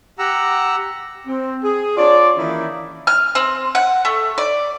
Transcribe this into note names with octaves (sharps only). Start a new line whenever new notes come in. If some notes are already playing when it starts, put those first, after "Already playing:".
G4 F#5 A#5 E6
C4
G#4
D4 F4 C#5 D5
D#3 E3 A#3 C#4 D#4 E4
F6
C4
F#5
A3
D5